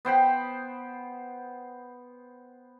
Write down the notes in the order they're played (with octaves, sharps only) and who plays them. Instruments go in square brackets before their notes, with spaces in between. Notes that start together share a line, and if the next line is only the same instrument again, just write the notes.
[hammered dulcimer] B3 C5 G5 B5